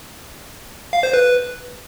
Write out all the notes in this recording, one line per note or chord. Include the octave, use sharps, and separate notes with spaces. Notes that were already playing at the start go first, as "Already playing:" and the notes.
F5
C5
B4